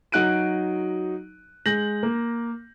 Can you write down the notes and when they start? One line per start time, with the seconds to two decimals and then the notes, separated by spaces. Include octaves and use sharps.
0.12 F#3 D#4 F#4 F#6 D7 D#7
1.66 G#3 G6 A#6 F#7
2.03 A#3